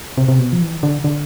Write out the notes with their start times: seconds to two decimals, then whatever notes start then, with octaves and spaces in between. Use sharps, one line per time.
0.18 C3
0.28 C3
0.39 B2
0.53 F3
0.62 E3
0.83 D3
1.04 D3